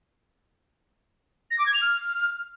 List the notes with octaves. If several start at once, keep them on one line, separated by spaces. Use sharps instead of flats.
A#6
D6
G#6
F7
F6